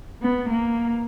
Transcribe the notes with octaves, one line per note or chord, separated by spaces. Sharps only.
B3
A#3